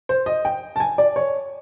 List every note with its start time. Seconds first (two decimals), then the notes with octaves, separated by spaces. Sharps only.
0.09 C5
0.26 D#5
0.45 G5
0.76 A5
0.80 G#5
0.98 D5
1.16 C#5